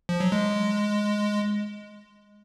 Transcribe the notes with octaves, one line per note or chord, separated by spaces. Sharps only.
F3
F#3
G#3